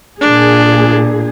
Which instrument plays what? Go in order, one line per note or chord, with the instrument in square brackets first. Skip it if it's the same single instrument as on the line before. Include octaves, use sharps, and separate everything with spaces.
[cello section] A#2 G#4 [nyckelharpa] D4